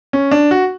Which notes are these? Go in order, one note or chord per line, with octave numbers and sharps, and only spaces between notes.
C#4
D4
F#4